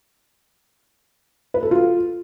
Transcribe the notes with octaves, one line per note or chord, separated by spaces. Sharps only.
B4
A4
F4